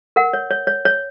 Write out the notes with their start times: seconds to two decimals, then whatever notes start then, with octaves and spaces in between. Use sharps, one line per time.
0.16 A#4 F#5
0.33 C#5
0.51 C#5
0.67 C#5
0.85 C#5